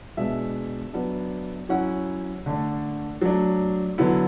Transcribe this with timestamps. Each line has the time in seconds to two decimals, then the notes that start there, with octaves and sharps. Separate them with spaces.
0.17 B2 G#3 D4 E5
0.93 F#3 B3 D4
1.69 F#3 C#4 E4 F#5
2.46 D3 A3 D4
3.22 F#3 A3 D4
3.98 D3 F#3 B3 E4